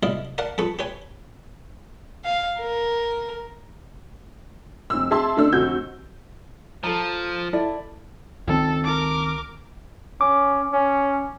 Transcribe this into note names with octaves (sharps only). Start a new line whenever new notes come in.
B1 C3 E4 D5 D#5 F5
A#4 D5 F5 F#5 A5
F2 G#4 A4 B4 C#6
G4 B4 C#5 G#5
F5
A#4
F1 E6
G#4 E5 A5 C6
C#3 A3 D4 E6
F1 D3 F#4 G6
F3 A4 A#5
E4 A4 D5
C#2 D#3 C4 A4
A#4 D6
C#4 D6
C#4